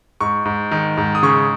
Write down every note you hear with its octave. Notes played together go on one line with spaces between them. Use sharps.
G#2 C#6
G#2
D#3
G#2
D#6
C#3 C#6